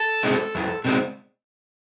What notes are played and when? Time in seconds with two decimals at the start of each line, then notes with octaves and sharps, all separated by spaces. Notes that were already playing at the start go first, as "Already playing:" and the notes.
Already playing: A4
0.23 B2 G#3 C4
0.55 E2
0.85 B2 G#3 C4